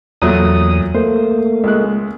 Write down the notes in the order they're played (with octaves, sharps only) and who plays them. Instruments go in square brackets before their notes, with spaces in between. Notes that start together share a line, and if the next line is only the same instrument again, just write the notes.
[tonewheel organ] E2 D#6 [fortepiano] A#2 F#3 A3
[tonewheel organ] A3 A#3 [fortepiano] C5
[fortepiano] C#2 G#3 F#6